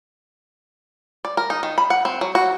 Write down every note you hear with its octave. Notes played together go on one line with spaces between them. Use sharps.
D5
A#4
D#4
D#3
B5
F#5
C4
F#3
F#4